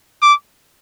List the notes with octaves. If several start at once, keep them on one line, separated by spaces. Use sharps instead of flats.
D6